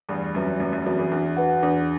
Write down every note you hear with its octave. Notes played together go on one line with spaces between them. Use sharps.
E2 G2 A3
F#2 C4 F#4 B4 E5
F#2 A3
F#2
E2 C4 F#4 B4 E5
E2
E2 D4
F#4 B4 F#5
E2 D4